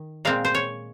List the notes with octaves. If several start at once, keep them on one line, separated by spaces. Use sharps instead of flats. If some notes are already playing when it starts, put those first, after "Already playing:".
Already playing: D#3
A#2 G#3 C4 F5
C5
C#5